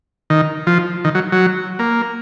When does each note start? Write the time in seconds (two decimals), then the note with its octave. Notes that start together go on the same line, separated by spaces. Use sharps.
0.30 D#3
0.67 F3
1.04 D#3
1.15 F#3
1.32 F#3
1.79 A#3